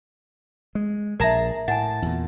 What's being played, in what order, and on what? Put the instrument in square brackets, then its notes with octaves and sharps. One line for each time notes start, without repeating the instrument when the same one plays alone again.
[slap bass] G#3
[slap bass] A#1 [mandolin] G#4 A5 A#5 [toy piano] A#4 E5
[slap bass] A2 [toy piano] F#5 G#5 [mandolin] A5
[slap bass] E2 A#2